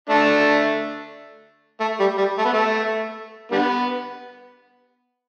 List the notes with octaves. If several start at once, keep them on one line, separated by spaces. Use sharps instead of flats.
A3 D4
A3
G3
G3
A3
B3
A3
D3 G3 B3